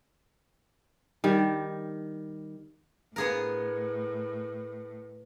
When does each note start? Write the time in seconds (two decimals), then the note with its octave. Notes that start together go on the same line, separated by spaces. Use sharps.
1.24 D#3 G3
3.16 A2 B3 G#4 A#4